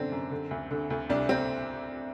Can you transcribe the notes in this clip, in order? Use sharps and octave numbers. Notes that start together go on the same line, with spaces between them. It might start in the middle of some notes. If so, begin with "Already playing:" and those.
Already playing: F#2 D3 C4 D4
F#2
D3
D2
D3
D2
C2 D4
C4